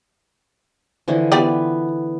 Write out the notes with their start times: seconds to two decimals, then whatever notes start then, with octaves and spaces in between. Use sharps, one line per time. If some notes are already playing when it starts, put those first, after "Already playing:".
1.08 D3 E3 F3
1.32 B3 F4 G4 B4 D5